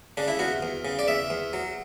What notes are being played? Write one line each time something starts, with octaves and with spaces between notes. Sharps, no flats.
C#3 D4
E4
E2 F#4
E2
C#3
D5
E2 E5
E2
F#3